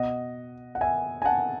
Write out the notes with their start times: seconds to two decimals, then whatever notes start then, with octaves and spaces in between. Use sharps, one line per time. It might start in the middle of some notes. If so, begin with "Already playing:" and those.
Already playing: B2 D#5 F#5
0.75 F#5
0.81 E5 G#5
1.22 G#5
1.25 F#5 A5